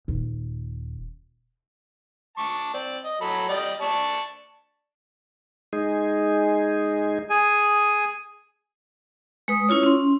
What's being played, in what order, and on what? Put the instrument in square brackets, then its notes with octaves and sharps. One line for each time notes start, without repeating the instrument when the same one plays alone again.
[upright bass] D#1
[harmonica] A5 C#6 D6
C4 D5
D#5
F#3 A4 B5
G3 D5 D#5
D5 A5 C#6
[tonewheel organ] G#3 D#4 G#4
[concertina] G#4 G#5
[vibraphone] G#3 B4 D#6
C#4 E4 F4 C#5
C#4 C6